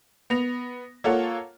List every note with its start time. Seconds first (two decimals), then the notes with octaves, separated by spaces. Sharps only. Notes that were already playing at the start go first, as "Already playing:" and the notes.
0.30 B3 A#6 F7
1.04 A#3 F4 A4 C#5 F#5